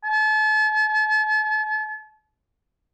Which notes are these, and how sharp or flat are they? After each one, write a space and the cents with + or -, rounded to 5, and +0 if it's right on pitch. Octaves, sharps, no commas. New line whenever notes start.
A5 -40